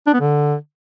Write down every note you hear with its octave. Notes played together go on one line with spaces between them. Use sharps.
D4
B3
D3